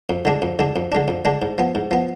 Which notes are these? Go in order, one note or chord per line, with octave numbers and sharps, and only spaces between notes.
F2
D3 G#3 D4
F2
D3 G#3 D4
F2
D3 G#3 D4
F2
D3 G#3 D4
G#2
F3 B3
G#2
F3 B3